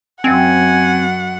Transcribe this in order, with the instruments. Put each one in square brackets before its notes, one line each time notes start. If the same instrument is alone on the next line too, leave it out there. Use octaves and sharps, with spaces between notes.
[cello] F#2 [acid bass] C4 [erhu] F#5 [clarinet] G#5